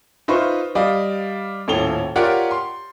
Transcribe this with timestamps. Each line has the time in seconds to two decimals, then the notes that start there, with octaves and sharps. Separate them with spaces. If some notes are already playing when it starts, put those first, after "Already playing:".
0.28 D#4 F4 B4 C5 E5 C#6
0.75 G3 D5 D#5 F5
1.68 D#1 A2 C#4 A4 F7 G7
2.16 F4 G4 A#4 C#5 D5 F#5
2.51 C6